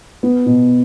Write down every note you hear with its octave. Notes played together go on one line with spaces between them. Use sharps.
B3
B2